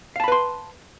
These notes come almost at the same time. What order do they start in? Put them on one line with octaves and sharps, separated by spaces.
F5 A5 B5 B4 C6